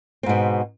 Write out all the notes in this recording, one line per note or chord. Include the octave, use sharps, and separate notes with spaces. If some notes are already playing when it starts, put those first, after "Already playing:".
G#2 B2 C4